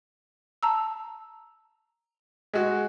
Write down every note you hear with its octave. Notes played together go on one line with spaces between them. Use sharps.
A5 A#5 E6
G#3 F#4